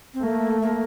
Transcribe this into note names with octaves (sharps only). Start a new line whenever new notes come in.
C4
A3 A#3
A#3